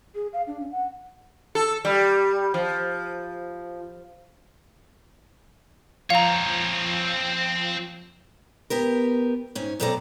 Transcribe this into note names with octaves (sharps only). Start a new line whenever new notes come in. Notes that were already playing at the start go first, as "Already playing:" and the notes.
G#4
F5
D4
C#4
F#5
A4
G3
F3
F3 C4 C#5 F5 A#5
B3 G4 A#4
G#2 C#4
F#2 B2 C4 A4 D5 A#5